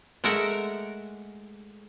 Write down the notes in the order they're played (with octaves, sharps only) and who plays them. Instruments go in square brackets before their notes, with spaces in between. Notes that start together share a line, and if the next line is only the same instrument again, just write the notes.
[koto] G#3 A3 A#4 E5 F#5 A#5